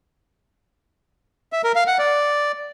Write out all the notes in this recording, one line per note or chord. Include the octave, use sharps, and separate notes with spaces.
E5
A#4
F5
F#5
D5